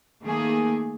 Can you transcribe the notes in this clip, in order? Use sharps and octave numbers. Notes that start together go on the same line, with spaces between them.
D#3 A3 A#3 G#4